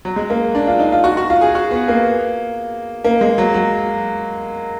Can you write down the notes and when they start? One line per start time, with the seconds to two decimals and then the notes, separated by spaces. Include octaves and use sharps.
0.05 F#3
0.16 G#3
0.30 A#3
0.55 D4
0.67 F4
0.79 D#4
0.92 F4
1.04 F#4
1.17 F#4
1.30 F4
1.41 G#4
1.55 F#4
1.71 B3
1.88 A#3
3.04 A#3
3.21 G#3
3.38 F#3
3.54 F#3